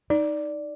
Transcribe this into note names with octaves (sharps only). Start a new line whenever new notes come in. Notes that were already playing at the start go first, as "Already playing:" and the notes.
D#4 D5